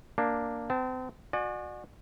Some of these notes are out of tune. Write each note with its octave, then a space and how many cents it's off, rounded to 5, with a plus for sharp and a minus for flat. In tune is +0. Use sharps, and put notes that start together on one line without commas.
A#3 +0 D4 +0
C4 -35 A5 +0
F#4 -25 D5 +40 G#5 +0